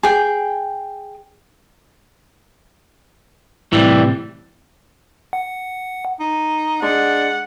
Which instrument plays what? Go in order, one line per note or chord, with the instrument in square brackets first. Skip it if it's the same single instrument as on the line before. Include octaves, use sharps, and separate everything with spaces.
[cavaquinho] G#4 G5
[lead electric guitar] A2 C3 [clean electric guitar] E3 G3
[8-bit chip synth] F#5
[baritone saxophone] D#4
[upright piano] G#3 [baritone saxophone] D4 [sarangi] F#5